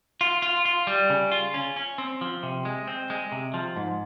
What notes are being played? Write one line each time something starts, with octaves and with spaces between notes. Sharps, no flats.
F4
F4
F4
G3
C#3
F4
C#4
C#4
C4
F3
C3
G#3
C4
G#3
C3
F3
G#2